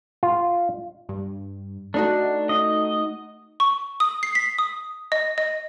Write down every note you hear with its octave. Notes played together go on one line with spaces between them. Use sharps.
F4
G2
A3 D4 D#4 F#4
D#5
C#6
D#6
C7
B6
D#6
D#5
D#5